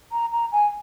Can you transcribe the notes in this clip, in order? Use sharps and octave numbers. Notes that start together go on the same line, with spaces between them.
A#5
A#5
G#5